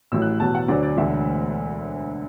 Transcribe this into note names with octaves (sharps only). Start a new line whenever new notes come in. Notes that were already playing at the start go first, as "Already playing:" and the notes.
A1 A2 F#3 E6
F#6
E2 B2 F#3 A5
F#5
D2 D3 F#3 D5
D5
E1 D2 D3 F#3 E5